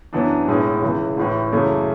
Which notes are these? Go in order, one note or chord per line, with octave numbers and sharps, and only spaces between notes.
F#2 E3 B3 D4
B1 A2 G#3
C#2 C#3 E3
A1 A2 E3
F#2 C#3 E3 A3